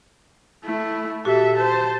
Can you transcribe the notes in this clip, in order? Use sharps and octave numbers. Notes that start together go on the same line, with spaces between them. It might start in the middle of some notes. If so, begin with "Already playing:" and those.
A3 E4
A#2 F#4 G4 A4 E5
C5 A5